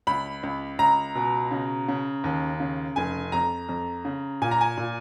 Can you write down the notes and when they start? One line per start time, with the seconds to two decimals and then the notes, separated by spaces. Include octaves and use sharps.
0.07 C#2 B5
0.43 C#2
0.79 C#2 A#5
1.15 B2
1.51 C#3
1.88 C#3
2.24 D#2
2.60 C#3
2.96 F1 G#5
3.32 F2 A#5
3.69 F2
4.05 C#3
4.42 A#2 G#5
4.51 A#5
4.61 G#5
4.77 A#2